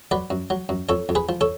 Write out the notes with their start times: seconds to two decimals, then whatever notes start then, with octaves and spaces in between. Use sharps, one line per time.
0.11 F#3 B4 D5
0.30 F#2
0.50 F#3
0.69 F#2
0.89 F2 A4 C#5
1.09 F2
1.15 G#4 B4
1.29 F3
1.41 A4 C#5